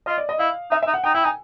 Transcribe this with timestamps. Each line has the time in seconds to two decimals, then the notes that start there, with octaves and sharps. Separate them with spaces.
0.06 F4 D#5
0.18 D5
0.29 D#5
0.39 E4 F5
0.71 D#4 E5
0.83 D#4 E5
0.94 F#5
1.04 D#4 G5
1.14 E4 G5
1.24 D#4 G#5